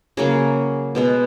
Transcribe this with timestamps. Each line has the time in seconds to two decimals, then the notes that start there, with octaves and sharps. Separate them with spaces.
0.17 C#3 F#3 A#3 G#4
0.95 B2 G#3 B3